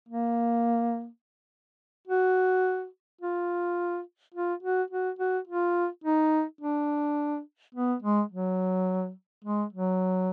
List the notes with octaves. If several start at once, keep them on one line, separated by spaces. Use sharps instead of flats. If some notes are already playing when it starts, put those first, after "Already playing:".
A#3
F#4
F4
F4
F#4
F#4
F#4
F4
D#4
D4
B3
G#3
F#3
G#3
F#3